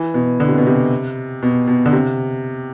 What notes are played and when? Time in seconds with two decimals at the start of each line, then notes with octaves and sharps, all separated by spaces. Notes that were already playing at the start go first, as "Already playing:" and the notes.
Already playing: E3
0.14 B2
0.40 D3
0.48 C3
0.58 B2
0.67 C3
1.43 B2
1.67 B2
1.86 D3
1.93 C3